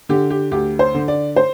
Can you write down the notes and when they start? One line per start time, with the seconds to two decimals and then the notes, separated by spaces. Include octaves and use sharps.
0.09 D3 G4
0.30 G4
0.51 D2 G4
0.79 C5
0.94 D3
1.08 D5
1.36 C5